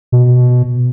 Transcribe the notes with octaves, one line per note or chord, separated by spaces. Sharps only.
B2